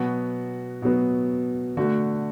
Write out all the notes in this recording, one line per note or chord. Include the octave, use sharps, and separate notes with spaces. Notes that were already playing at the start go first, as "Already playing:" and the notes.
Already playing: B2 F#3 B3 F#4
B2 F#3 B3
D3 A3 F#4